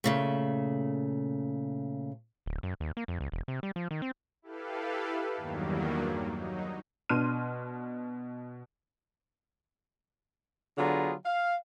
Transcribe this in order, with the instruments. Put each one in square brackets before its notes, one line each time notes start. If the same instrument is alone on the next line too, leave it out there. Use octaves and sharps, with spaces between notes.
[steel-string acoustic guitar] A#2 C#3 A3
[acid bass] D1
F#2
D#2
A#3
F2
C#2
E1
C3
G3
F3
D#3
C4
[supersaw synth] E4 G4 A4 B4 F5
E2 G2 D#3 F#3 G3 A#3
F#3 D#4
[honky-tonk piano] B2 D4 C6 F6 D#7
[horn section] D3 F#3 B3 F4 G#4 A#5
F5